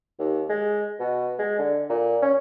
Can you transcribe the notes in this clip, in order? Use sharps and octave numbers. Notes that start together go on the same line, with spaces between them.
D#2
G#3
B2
G#3
D3
A#2
C#4